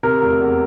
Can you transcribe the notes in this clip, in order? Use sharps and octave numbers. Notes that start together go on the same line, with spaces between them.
C3 A#4
F1
E2